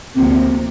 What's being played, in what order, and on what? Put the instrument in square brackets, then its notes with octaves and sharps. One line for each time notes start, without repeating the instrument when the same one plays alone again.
[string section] D2 C3 F3 A#3 [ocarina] C4